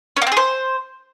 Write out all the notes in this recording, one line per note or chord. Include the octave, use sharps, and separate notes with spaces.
C#4
A#3
C4
G#4
C5